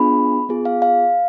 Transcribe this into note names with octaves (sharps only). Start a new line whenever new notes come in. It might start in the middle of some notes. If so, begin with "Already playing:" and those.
Already playing: B3 D4 F4 G#4 B5
B3 F4 G#4
F5
F5